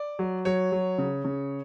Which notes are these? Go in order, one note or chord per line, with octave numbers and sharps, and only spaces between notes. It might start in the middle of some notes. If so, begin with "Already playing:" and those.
Already playing: D5
F#3
F#3 C#5
F#3
C#3
C#3